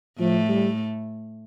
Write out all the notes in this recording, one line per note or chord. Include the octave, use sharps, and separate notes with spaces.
A2 F3 A3
G3